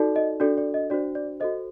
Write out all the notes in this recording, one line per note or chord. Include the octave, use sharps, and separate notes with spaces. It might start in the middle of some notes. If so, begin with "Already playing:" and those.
Already playing: D#4 F#4 A4 D5
D#5
D4 F#4 A4 D5
D5
D#5
D4 F#4 C5 D5
D5
F#4 A4 C5 D#5